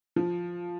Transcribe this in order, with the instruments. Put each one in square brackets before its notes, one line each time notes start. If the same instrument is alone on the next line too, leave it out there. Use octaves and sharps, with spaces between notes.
[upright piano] F3